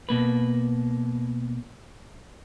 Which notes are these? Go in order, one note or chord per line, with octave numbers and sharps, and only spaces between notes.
B2 A#3 B4